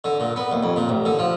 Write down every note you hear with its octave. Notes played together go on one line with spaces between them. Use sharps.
D3
A#2
B3
D#2
F2
A#2
A1
D3
F3